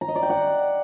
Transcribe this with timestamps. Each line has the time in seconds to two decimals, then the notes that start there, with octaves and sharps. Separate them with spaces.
0.01 A#5
0.08 D#5
0.15 D5
0.23 G5
0.30 F#5